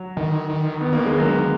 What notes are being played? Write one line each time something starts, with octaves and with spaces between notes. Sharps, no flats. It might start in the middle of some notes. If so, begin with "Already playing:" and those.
Already playing: F#3
D#3
D#3
D#3 B3
A#3
G#3
F#3 A#3